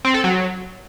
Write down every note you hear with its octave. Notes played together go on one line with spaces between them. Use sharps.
C4
A4
F#3